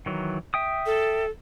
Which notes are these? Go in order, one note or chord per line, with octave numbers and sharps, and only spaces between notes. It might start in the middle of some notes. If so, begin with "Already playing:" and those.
D#3 E3 F#3
E5 G5 D#6
A4